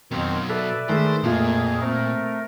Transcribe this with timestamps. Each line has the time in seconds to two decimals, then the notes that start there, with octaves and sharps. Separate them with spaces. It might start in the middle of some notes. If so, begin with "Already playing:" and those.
0.11 F2 B2 D#3 F#3 C4
0.49 A4 B4 D5 E5
0.89 D#3 G#3 A3 C5
1.23 F2 A#2 A3 A#3 F4 G#4
1.81 A3 C4 A#4